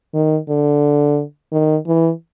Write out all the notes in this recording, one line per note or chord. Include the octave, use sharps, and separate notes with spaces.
D#3
D3
D#3
E3